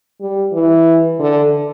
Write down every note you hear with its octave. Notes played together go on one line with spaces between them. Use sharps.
G3
E3
D3